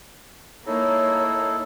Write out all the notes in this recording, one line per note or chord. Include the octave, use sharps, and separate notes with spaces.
A#3 D#4 E4 A4 C#5